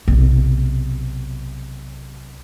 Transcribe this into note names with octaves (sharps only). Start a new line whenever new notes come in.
B1 C3